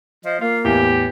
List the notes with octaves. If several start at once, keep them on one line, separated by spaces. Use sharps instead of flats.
F3 D#5
A#3 F4
E2 A2 G4